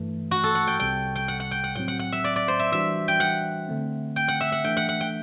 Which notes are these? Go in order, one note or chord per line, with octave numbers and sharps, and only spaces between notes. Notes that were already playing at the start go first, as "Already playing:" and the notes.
Already playing: G2 E3 A3
F#4
A4
F#5
G5
C2 C3 G3 G5
G5
F#5
F#5
G5
F#5
A2 F#3 C4 G5
F#5
F#5
E5
D5
D5
C5
E5
E3 G3 D4 F#4 E5
G5
F#5
D3 A3 C4
G5
F#5
E5
F#5
E3 A3 D4 G5
F#5
F#5
G5